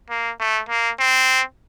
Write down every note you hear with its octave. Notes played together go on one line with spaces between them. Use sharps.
A#3
A3
A#3
C4